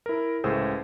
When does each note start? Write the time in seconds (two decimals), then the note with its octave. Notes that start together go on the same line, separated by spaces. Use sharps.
0.06 E4 A#4
0.44 C#2 A2 G#4 C5 E6